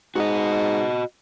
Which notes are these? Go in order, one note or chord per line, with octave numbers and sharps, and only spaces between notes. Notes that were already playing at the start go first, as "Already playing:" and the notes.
G#2 F#4 D#5